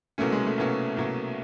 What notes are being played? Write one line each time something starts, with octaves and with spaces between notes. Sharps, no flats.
C2 B2 F#3 A3 A#3 C#4
G#3
A3
C2 B2 F#3 A#3 C#4
C2 B2 F#3 A#3 C#4